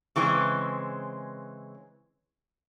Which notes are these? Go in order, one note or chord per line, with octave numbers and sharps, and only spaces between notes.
C#3 E3 G#3 C4